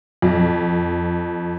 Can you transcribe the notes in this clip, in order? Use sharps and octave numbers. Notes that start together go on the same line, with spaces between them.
F2